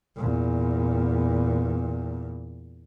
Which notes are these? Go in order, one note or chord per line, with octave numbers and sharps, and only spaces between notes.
E2 A#2